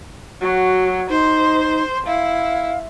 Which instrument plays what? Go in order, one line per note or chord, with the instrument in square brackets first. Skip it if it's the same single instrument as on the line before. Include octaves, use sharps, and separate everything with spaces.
[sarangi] F#3 [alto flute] F#4
[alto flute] D#4 [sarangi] C5
[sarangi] E4 [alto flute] F5